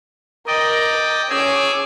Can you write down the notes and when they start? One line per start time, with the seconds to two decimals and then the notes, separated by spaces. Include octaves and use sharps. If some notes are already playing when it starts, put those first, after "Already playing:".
0.47 A#4 D5 D#5 G5
1.30 C#4 G#4 G#5 D6 E6